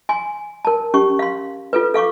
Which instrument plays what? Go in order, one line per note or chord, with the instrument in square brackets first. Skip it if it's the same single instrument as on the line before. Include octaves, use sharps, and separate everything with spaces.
[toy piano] G#5 C6
A#4 A5
C#4 G4 C#6
F5 C6
F4 A4 B4
A4 F5 C#6 D6